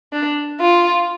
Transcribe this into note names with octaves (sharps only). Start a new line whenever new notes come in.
D4
F4